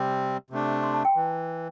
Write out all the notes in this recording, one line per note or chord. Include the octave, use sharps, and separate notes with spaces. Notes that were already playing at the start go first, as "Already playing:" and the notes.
Already playing: C3 G3 C4
C3 A3 D4
C6
A5
G5
E3